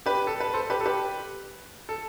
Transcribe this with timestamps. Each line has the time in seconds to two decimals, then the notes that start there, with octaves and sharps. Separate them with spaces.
0.06 G4 B4
0.27 A4
0.40 B4
0.54 A4 C5
0.70 G4 B4
0.81 A4
0.86 G4 B4
1.89 A4